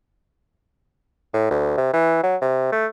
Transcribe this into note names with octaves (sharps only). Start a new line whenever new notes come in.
A2
D2
C3
E3
F#3
C3
A3